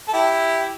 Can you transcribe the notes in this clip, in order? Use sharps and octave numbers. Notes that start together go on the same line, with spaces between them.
A4
E4 G4